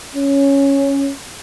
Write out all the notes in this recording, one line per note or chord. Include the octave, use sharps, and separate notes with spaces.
C#4